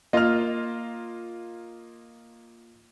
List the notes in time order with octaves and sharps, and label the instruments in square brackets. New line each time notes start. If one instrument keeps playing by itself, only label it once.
[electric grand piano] A#3 F4 [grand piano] D#5 F6